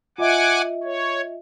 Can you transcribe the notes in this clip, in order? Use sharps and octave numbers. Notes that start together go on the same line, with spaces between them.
F4 D#5 E5 F#5 G#5 D6
C#5